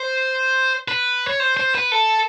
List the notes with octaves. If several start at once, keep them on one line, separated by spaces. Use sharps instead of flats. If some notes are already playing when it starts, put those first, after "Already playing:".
Already playing: C5
B4
C#5
C5
C5
B4
A4